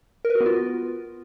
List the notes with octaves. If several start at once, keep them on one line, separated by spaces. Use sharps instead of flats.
A#4
B4
F#4
B3
F4